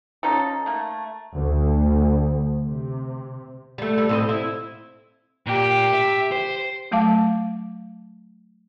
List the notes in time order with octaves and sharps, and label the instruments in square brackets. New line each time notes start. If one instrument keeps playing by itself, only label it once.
[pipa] C#4 D#4 F4 A4
A3 A#3
[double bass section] D2
C3
[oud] G3 A3
G3
A2 C4 D#5
E4
[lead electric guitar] A#2 [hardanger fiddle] G4
[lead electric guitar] E5
C5
[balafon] F#3 A3 F5 A5 D6